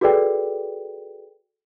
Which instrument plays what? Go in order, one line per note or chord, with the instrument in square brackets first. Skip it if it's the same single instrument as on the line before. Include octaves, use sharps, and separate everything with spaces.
[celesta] F#4 G#4 A4 B4 D5 G5